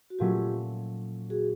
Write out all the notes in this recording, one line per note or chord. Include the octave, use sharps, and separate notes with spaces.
F#4
A#2 F#3 A3 C#4 F4 G4
F#4 G#4